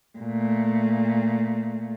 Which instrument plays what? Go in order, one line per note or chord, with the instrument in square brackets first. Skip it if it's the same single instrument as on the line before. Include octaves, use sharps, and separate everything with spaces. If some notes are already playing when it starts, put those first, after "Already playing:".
[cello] A#2 A3